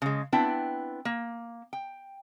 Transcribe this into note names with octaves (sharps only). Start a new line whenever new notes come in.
C#3 G#3
B3 C4 D4 E4 G5
A#3
G5